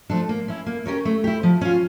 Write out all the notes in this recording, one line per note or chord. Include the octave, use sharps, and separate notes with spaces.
F3 A3 D4 A4
A#3
C#4 E4
A#3
C#4 G4 A#4 C#5
A3
E4 G4
F3
C#4 F4